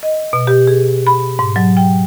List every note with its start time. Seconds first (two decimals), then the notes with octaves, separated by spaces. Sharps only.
0.03 D#5
0.33 B2
0.47 G4
0.67 G#4
1.07 B5
1.39 G#2
1.56 F#3
1.77 G5